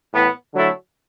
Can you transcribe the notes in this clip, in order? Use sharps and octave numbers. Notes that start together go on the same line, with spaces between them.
A2 E3 B3
D3 F#3 A3 E4 A4